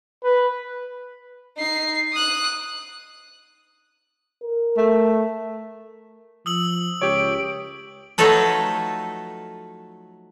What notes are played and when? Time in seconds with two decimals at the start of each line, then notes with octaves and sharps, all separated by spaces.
0.24 B4
1.57 D#4 C7
2.13 D#6 F#6
4.43 A#4
4.77 A3
6.46 F3 D#6 E6 F#7
7.02 C#2 G4 C#5 D7
8.18 F3 F#3 A3 D#4 A4 B4